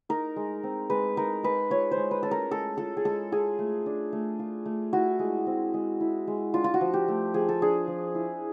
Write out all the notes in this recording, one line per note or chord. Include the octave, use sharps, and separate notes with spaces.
D#4 A#4
G#3
C4
G#3 B4
D#4 A#4
G#3 B4
F4 C#5
C5
G#3
B4
C#4 A4
A#4
G#3 A4
F4 A4
G#4
G#3 A4
F4 G#4
A3
D4
A3
F4
A3
E4 F#4
G#3
C4
G#3
E4
G#3
D4 F4
F4
F#4
F3
G4
A3
F3 G#4
A4
D4 G#4
F3
E4